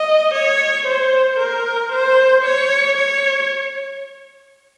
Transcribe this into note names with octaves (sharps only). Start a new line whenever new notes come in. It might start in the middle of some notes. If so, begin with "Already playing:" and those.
Already playing: D#5
C#5
C5
A#4
C5
C#5
C#5